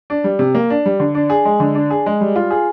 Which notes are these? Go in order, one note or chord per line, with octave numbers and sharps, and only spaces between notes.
D4
G3
C3
A#3
D4
G3
D3
D4
G#4
G#3
D3
D4
G#4
G#3
G3
F4
G#4